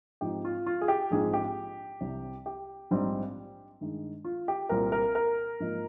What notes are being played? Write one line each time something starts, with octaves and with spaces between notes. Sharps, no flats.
G#2 F3 C4 D#4 G4
F4
F4
G#4
G4
A#1 G#2 F3 C4 G#4
G4
C2 C3 G3
G4
A#1 G#2 G3 C4 D#4
G2 D#3 G#3 D#4
F4
G4
C2 A#2 G3 C4 A#4
A#4
A#4
G#2 F3 A#3 D#4